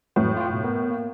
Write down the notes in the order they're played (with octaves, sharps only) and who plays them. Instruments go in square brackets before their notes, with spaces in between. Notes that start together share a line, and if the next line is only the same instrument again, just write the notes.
[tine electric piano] F2 E3 F#3 [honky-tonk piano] A2
[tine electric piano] F4 G5
G#2 B2
B3 A#4
A#3